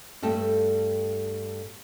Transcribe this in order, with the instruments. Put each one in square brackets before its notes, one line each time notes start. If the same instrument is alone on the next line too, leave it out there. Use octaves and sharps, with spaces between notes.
[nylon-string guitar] G2 A3 A4